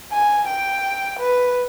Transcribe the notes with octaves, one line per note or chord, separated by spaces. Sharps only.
G#5
G5
B4